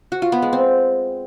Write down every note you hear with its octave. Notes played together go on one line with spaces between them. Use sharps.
F#4
F4
B3
G#3
C4